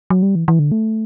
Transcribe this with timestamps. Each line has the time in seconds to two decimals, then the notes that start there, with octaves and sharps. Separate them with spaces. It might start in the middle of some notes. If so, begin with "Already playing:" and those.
0.10 F#3
0.22 G3
0.35 E3
0.48 E3
0.59 D3
0.72 A3